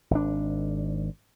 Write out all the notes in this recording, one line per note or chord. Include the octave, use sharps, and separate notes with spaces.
G#1 D4